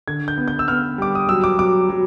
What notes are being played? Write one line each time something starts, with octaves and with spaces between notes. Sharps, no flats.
D3 G#6
G6
B3
G6
E6
B3 F6
G3 D6
D#6
F#3 E6
D6
F#3 D6
F#3